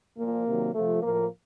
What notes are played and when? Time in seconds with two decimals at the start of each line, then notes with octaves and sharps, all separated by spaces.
0.18 A#2 F3 A#3
0.47 C3 D#3 F#3
0.75 C3 F3 A3
1.03 A2 F3 A#3